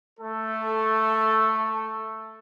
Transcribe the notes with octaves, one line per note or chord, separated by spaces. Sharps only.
A3 A4